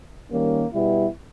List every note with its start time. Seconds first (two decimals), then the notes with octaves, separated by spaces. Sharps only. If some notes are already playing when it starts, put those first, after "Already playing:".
0.30 D#3 G3 A#3 C#4
0.73 B2 G3 B3 E4